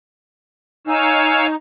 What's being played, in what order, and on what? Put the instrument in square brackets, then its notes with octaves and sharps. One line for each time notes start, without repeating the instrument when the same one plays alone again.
[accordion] D#4 [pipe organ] C#5 F5 E6 [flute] G#5